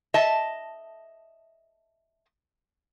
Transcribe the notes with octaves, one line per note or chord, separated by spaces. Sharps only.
D#5 E5 A5